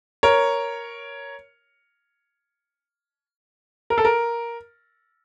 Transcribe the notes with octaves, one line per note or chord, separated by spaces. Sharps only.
A#4 C#5
A#4
A4
A#4